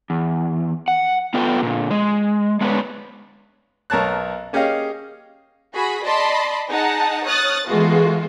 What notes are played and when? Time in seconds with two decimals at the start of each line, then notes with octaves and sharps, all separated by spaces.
0.10 E2
0.88 F#5
1.34 B3 F4 A4 B4 G5
1.63 A#2 D3
1.91 G#3
2.61 G#3 B3 D4 F4 B4 C#5
3.90 B1 A#4 C#5 A5 F#6
4.53 A#3 C#4 G4 G#4 D#5 F5
5.74 F#4 G#4 B5
6.04 D5 D#5 A5 B5 C6
6.69 D#4 G#4 F#5 A5
7.25 C#5 D#6 F6 F#6 A6
7.68 E3 G#3 A3 B3 F4 F#4